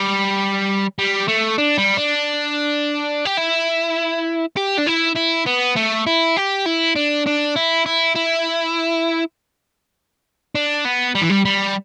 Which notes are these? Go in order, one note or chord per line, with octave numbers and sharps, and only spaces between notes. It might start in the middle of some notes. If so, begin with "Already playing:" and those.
Already playing: G3
G3
A3
D4
G3
D4
G4
E4
G4
D4
E4
E4
B3
A3
E4
G4
E4
D4
D4
E4
E4
E4
D4
B3
G3
E3
G3
G3